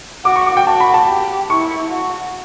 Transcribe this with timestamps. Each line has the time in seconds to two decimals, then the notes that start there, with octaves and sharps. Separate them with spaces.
0.25 F#4 D6
0.36 C#6
0.46 D6
0.57 G5
0.66 F#4 A5
0.80 B5
0.94 A5
1.08 G4
1.50 E4 C#6
1.90 F#4